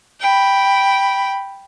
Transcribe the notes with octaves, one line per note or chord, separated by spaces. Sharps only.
G5 B5